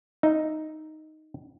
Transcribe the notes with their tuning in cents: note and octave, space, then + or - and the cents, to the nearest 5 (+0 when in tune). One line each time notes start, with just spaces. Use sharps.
D#4 +0 E5 +0